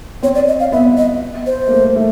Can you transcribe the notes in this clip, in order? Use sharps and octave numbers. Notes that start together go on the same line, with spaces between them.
C4 C#5
D5
D#5
F5
B3 E5
D#5
C5
A#3
A3
A3